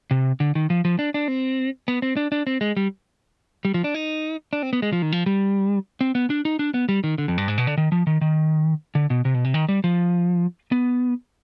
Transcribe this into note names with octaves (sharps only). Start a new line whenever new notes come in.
C3
D3
D#3
F3
F3
D4
D4
C4
B3
C4
D4
D4
C4
G#3
G3
G3
F3
D4
D#4
D4
C4
B3
G#3
F3
D#3
F3
G3
C4
B3
D4
D#4
D4
B3
G3
D#3
D3
F2
G2
G#2
B2
D3
D#3
F3
D#3
D#3
D3
B2
C3
B2
C3
D#3
G3
F3
B3